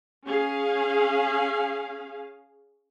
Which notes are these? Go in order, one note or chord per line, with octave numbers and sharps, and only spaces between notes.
C#4 G#4 F5